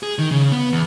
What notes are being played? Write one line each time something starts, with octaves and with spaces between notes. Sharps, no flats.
G#4
D#3
C#3
B3
E2